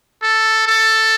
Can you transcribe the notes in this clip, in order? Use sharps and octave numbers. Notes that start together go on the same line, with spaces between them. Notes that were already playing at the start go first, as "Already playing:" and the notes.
A4
A4